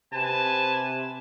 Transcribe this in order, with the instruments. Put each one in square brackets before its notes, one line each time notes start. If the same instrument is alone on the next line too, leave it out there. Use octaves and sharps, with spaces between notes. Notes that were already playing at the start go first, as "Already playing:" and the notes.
[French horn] C3 [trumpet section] B4 G#5 A5